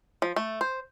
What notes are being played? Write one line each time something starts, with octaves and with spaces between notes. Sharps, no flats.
F3
A3
C5